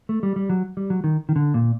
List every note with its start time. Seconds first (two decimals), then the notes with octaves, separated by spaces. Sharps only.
0.09 A3
0.23 G3
0.36 G3
0.50 F#3
0.77 G3
0.90 F#3
1.04 D#3
1.29 D#3
1.36 D3
1.54 A#2